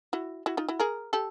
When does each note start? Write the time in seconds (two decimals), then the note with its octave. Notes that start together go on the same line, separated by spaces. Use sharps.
0.13 E4 F#4
0.46 E4 F#4
0.57 D#4 F4
0.68 E4 F#4
0.80 G#4 A#4
1.13 G4 A4